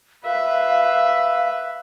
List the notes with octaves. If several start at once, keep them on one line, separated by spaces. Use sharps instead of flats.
B4 E5 F5